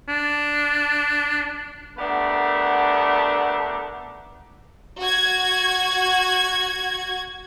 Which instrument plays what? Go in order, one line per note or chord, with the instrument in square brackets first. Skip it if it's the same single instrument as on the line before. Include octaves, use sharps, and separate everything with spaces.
[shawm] D4
[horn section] A3 B3 D4 G4 A#4 F#5
[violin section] F#4 G#6